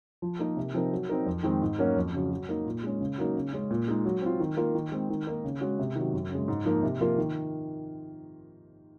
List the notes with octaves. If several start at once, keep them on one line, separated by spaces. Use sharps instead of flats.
F3
A#3 D#4 A#4
C3
F3 C4 D#4 A#4
F#3
C4 D#4 A#4
F2
D#3 G#3 C4
G#2
F#3 A#3 C#4 F#4
F2
C#3 F#3
F#3
A#3 D#4
A#2
G#3 C#4
C#3
F#3 A#3 D#4
C#3
G#3 C#4
A#2
G#3 D#4
F#3
C4 F4
D#3
A#3 F4 A#4
D#3
G#3 C4
D#3
A#3 D#4 A#4
C#3
G#3 C#4 F#4
C3
D#3 F#3
F#2
C#3 G#3
G#2
F3 A#3 D#4
C3
F3 A#3 F4 A#4
D#3